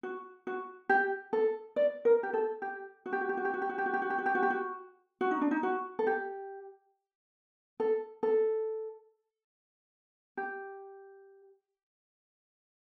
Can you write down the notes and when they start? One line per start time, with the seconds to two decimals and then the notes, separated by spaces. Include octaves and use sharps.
0.03 F#4
0.47 F#4
0.89 G4
1.33 A4
1.76 D5
2.05 A#4
2.23 G4
2.34 A4
2.62 G4
3.06 F#4
3.13 G4
3.21 F#4
3.29 G4
3.37 F#4
3.45 G4
3.54 F#4
3.62 G4
3.69 F#4
3.78 G4
3.86 F#4
3.94 G4
4.02 F#4
4.10 G4
4.18 F#4
4.26 G4
4.35 F#4
4.43 G4
4.50 F#4
5.21 F#4
5.31 D#4
5.41 D4
5.51 D#4
5.63 F#4
5.99 A4
6.07 G4
7.80 A4
8.23 A4
10.37 G4